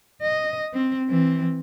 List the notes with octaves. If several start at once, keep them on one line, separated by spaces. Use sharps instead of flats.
D#5
C4
E3 C4